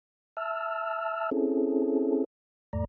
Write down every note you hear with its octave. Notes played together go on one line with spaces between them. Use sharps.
E5 A5 E6 F6
C4 C#4 E4 G#4 A4
E2 G#2 A3 D5 A#5